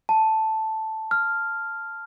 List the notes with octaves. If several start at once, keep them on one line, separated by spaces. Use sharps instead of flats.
A5
F6